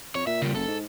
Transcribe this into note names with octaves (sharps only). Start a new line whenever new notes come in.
F2 C#5
A#2 E5
C#3 G3
F#1 A4
G#2